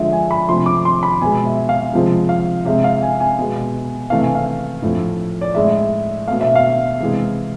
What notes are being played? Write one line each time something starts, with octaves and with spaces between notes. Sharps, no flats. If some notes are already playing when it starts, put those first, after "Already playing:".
Already playing: D3 F3 G#3 E5
G#5
B5
C3 F3 A3 C6
D6
C6
B5
B2 G#3 G#5
E5
F5
C3 F3 G#3
F5
C3 G#3 E5
F5
G#5
G#5
B2 G#3
C3 E3 A3 F5
G#5
F5
A2 F3 A3
D5
A2 G#3 E5
B2 A3 F5
E5
F5
C3 E3 G#3